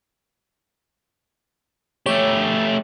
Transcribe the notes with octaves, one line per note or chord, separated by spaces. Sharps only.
A3 G4 C#5